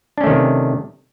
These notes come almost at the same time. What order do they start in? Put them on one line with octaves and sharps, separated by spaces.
D4 C#4 A3 D#3 C3